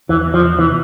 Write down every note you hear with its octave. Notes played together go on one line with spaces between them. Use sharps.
E2 E3
E2
F3
C3
E2 E3